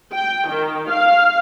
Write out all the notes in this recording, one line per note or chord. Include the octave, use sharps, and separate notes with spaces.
G5
D#3
F5